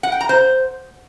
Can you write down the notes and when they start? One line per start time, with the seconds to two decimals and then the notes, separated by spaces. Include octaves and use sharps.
0.03 F#5
0.12 G5
0.21 A#5
0.29 C5